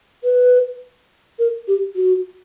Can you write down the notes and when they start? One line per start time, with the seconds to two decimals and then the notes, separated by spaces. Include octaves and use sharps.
0.24 B4
1.39 A#4
1.68 G4
1.96 F#4